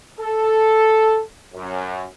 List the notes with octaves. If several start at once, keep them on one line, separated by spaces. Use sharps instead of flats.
A4
F#2